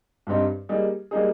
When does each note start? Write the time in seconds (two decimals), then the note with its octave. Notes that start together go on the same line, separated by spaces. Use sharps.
0.27 G2 G3 C4 D#4
0.69 G3 A#3 D#4 G#4
1.11 G3 A#3 D#4 G#4